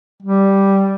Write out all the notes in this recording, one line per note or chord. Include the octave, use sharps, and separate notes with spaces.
G3